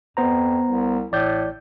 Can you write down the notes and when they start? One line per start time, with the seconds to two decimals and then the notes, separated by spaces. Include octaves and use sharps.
0.17 F2 B3 C5 A#5
0.65 C2
1.12 A1 A2 D5 G6